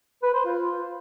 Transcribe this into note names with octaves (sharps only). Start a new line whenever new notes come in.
B4
C5
F4